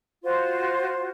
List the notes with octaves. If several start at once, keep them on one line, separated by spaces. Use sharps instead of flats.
F4 F#4 C5